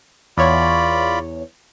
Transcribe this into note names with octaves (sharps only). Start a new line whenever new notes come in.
E2 F4 C#5 D5 B5